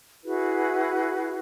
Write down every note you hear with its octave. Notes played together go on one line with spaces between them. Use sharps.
E4 F#4 G#4 B4